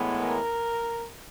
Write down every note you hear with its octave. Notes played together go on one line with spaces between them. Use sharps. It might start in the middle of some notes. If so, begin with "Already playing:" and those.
Already playing: A2 E3 G#3 B3
A#4